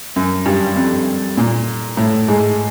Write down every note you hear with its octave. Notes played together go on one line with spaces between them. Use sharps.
F#2
G2
F2
A#2
A2
G#2